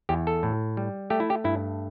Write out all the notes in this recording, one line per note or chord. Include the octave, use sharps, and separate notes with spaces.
E2 G4
A4
A2
G3
A3 G4
E4
G4
G2 E4